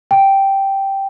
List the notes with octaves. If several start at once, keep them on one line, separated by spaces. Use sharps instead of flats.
G5